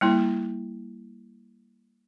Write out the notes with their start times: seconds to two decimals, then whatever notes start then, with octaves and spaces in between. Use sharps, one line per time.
0.01 G3 A#3 E4